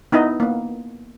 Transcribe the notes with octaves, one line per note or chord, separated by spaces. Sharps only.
B3 D#4 E4 D#5
A#3 B3